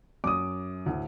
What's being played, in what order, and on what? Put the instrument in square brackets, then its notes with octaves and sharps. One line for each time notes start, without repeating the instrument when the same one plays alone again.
[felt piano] F#2 [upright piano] D6 D#6
[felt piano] D2 A2